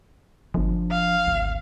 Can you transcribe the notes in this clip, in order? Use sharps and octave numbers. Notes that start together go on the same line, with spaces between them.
G1 F3 D4
F5
G#1 D2